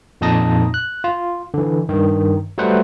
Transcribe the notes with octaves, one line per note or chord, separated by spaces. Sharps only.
F2 A#2 D#4 A5 D#6 A#6
F#6
F4
D3 E3
G2 D#3
F#3 G3 A3 B4 C5 F#5